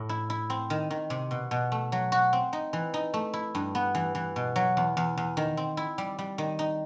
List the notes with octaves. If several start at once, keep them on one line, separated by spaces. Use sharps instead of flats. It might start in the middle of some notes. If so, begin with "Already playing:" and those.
Already playing: A2 A3
E4
E4
C4
D#3
D#3
C3
B2
B2
A3
F#3
F#4
C4
D#4
E3
D#4
A3
E4
G2
B3
E3
E3
B2
F#3
E2
E2
E2
D#3
C4
E4
G3
G3
D#3
D#4